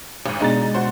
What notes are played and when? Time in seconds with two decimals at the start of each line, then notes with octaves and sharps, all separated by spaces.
0.26 G#1 G#2
0.40 B2 G#3 D4 D#4 A#5 A6
0.74 F#4 C5 C6